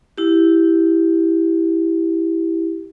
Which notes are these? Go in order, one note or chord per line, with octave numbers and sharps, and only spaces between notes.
E4 G4